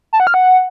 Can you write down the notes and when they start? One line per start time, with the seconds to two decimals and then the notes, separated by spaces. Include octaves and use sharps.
0.13 A5
0.20 F#5
0.27 F6
0.34 F#5